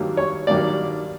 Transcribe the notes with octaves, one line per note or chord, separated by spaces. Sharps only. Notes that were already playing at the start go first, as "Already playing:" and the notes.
Already playing: G2 D#3 F#3 A#3
C#5
G2 D#3 F#3 A#3 D5